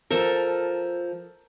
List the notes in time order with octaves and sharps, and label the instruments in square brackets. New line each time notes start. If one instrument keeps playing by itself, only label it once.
[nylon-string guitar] F3 [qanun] A4 A#4